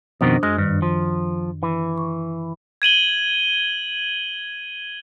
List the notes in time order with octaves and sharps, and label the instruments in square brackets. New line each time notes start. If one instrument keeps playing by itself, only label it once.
[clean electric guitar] F2 B2 D#3 [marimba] D4 C5 D#6
[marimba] F#2 F6 A#6 [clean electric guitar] G#3
[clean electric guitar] G2 [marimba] D#3
[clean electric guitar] F3
E3
[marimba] C#6
[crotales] G#6 D#7 F#7 G7